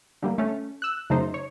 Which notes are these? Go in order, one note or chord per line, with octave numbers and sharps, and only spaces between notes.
D3 G3 A#3
A3 C#4
E6 F#6
F#2 C#3 A3 D#4 C5
C#5